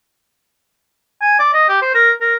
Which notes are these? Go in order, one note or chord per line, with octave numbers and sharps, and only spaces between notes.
G#5
D5
D#5
G4
C5
A#4
A#4